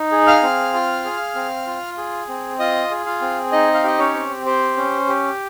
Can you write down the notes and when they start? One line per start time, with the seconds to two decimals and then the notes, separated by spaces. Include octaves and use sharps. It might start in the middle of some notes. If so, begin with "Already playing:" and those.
Already playing: D#4
0.12 G#4
0.27 F5 F6
0.43 C4
0.74 F4
1.05 G#4
1.35 C4
1.67 F4
1.98 G#4
2.29 C4
2.59 F4 D#5 D#6
2.91 G#4
3.06 F4 F5
3.22 C4
3.52 D#4 D#5
3.74 F5
3.84 G4 D#5
3.99 C#4 C#5
4.15 C4
4.46 G4 C5
4.77 C#4
5.08 G4